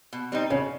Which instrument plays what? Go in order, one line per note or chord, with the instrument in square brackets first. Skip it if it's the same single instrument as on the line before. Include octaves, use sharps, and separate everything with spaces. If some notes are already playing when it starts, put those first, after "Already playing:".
[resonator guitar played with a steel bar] B2
G3 C4 D#4
[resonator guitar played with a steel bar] C#3 [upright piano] C#4